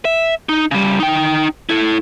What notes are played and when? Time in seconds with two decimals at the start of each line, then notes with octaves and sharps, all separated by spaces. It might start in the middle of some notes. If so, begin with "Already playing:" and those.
0.05 E5
0.49 D#4
0.71 C#3 G3
1.00 D#4 G5
1.69 E4 A4